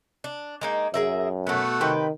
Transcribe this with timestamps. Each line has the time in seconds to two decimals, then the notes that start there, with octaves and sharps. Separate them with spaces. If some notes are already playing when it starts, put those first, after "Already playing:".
0.24 D4
0.61 G#3 A#3 D#4
0.94 F#2 G#4 A#4 E5
1.47 B2 A3 B3 F#4 F#5
1.81 C3 D#3 B4 G5